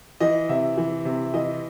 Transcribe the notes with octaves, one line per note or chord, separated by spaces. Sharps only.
E3 D#5
C3 E5
E3
C3
E3 D#5